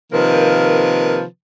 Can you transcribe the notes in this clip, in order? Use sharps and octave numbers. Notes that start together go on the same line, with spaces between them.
C3 D#3 F3 A#3 B4